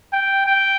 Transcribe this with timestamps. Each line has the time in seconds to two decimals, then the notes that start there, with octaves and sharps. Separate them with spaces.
0.13 G5
0.46 G5